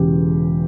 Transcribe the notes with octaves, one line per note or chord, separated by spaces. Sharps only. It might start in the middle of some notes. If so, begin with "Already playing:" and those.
Already playing: E1 E2 C#3 G4